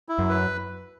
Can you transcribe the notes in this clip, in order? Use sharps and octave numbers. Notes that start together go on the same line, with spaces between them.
E4
F#2
B4